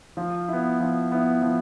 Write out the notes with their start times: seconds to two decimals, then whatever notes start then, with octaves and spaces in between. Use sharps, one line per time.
0.17 F3
0.48 B3 E4
0.80 F3
1.12 B3 E4
1.42 F3